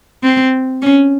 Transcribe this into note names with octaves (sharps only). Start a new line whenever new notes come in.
C4
C#4